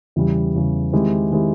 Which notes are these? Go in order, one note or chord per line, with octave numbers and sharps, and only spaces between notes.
E2 C#3 E3 G3
E2 C#3 E3 G3
D#3 G#3 C4 E4 G4
D#3 G#3 C4 E4 G4